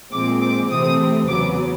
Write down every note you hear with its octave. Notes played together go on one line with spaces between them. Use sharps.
A#2 F3 G#3 C4 D6
D6
C3 E3 A3 C4 D#6
E2 C#3 F#3 B3 D6